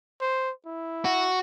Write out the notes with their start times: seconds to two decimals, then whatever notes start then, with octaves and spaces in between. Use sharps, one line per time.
0.21 C5
0.66 E4
1.05 F#4